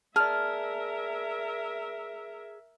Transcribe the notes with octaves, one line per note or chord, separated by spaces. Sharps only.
G#4 A#4 D5 E5 A5 F6